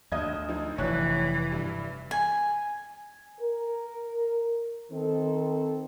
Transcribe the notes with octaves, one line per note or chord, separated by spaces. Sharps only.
D2 D#5 G#6
F3 D#4
F1 E3 C#5 D5 F#6
G2
G#5
A#4
D#3 C4 A4